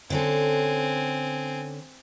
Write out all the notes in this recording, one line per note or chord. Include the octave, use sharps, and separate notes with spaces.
D3 C4 C#4 A4 G#5